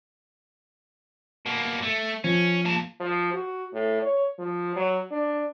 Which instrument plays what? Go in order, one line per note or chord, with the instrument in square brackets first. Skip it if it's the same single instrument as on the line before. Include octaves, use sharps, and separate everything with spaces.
[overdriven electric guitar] B2 A#3
A3
[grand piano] F3 [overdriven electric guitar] C#4
[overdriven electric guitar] A#3 A5
[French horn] F3
F#4
A2
C#5
F3
F#3
D4